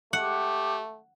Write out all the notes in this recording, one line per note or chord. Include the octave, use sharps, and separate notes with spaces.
A3 G4 F#5